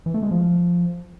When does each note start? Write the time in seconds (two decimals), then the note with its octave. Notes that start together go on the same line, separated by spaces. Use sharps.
0.06 E3
0.14 A3
0.23 G#3
0.31 F3